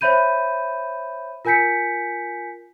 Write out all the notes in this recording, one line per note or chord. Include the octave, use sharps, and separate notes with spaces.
C5 C#5 E5 B5 G6 D#7
F4 A#4 G#5 G6 B6 C#7